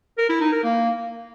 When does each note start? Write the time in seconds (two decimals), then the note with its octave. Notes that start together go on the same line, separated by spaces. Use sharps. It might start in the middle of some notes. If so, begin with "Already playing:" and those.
0.18 A#4
0.29 E4
0.41 D#4
0.52 A#4
0.64 A#3